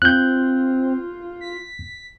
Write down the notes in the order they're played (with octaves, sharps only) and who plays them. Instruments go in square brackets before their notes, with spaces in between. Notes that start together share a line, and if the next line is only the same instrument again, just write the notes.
[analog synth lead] C4 [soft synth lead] F4 [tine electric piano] F#6 G6
[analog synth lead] B6